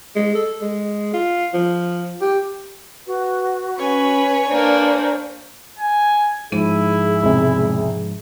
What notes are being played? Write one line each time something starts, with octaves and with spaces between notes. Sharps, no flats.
G#3
A4
G#3
F4
F3
G4
F#4 B4
C#4 B4 C#5 G#5
A#3 D4 B4 C5
G#5
G#2 F3 E4 G#4 D#7
E1 C3